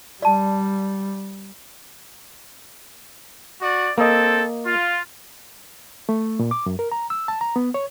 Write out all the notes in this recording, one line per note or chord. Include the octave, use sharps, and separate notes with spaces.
G3 D5 A5
F#4 D5
A#3 C4 A4 D#5
F4
A3
A#2
D6
F#2
A#4
A#5
E6
A5
A#5
B3
C#5